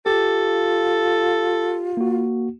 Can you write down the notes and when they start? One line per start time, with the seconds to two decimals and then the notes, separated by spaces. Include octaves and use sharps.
0.06 F4 G4 A4
1.97 A#3 F#4